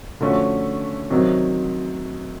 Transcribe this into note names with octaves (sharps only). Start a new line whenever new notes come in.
D3 F3 A3 C#4 F#4
C3 D#3 F#3